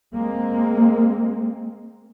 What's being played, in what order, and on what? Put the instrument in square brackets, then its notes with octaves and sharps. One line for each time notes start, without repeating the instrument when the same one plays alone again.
[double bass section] G#3 A#3 C4